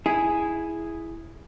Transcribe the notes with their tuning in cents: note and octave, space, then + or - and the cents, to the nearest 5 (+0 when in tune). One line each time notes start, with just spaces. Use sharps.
E4 +0 G#4 +0